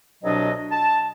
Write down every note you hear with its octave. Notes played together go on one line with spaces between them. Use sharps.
C2 B2 F#3 D4 D#5
A5